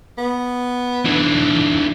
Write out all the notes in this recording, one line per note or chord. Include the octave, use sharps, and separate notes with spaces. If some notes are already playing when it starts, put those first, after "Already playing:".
B3
D3 E3